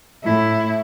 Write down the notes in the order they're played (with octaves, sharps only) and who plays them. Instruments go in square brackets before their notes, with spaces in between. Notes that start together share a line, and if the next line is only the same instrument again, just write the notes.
[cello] A2 E4